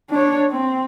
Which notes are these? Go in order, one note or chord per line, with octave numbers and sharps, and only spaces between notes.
D4 C#5
C4